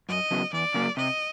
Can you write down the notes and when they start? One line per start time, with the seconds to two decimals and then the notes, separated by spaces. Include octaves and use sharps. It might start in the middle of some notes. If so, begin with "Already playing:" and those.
0.09 F#2 D#5
0.31 C#3 F#3 B3
0.53 E2 D5
0.74 C#3 F#3 A#3
0.97 C3 D#5